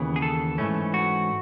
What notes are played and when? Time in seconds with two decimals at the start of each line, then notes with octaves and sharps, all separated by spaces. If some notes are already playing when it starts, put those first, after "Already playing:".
Already playing: D#2 C#3 E3 B3
0.16 G#4
0.22 A4
0.58 G#2 E3 A3 C#4
0.94 F#4